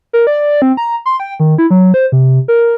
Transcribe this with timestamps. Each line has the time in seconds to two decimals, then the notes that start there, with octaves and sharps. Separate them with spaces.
0.13 A#4
0.27 D5
0.62 C4
0.77 A#5
1.06 C6
1.20 G5
1.40 D#3
1.58 E4
1.71 F#3
1.94 C5
2.12 C3
2.48 A#4